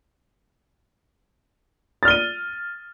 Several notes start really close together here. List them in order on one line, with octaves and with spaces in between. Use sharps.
A6 F6 G7 D#7